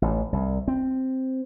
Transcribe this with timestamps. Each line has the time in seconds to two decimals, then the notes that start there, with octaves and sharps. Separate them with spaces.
0.02 A1
0.33 C2
0.68 C4